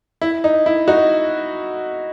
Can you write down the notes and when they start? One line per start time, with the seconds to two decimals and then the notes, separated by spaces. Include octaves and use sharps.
0.21 E4
0.44 D#4
0.66 E4
0.88 D#4 F#4